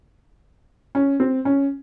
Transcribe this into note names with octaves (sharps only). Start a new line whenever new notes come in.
C#4
C4
C#4